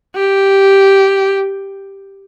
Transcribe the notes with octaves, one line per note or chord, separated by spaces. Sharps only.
G4